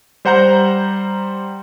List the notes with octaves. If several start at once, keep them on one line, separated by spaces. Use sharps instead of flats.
G3 C5 F#5 A#5 G6